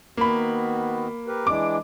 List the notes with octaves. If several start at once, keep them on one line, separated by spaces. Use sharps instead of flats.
D#3 A#3 B3 F#4 B5
G4 A#4 B4
E3 G#3 D4 D6